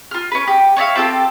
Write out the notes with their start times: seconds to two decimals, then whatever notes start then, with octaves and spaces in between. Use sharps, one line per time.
0.11 F4 F6
0.31 C#4 B4
0.47 G4
0.76 C#5 D5 E5 F5
0.95 C4 F4 G4 A4